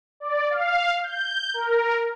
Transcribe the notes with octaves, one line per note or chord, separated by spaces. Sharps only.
D5
F5
G6
A#4